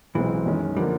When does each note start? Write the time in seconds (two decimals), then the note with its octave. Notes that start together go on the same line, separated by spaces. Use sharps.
0.15 B1 B2 E3 G#3 C4
0.46 F#2 D#3 G#3 C#4
0.77 D3 F3 G3 A#3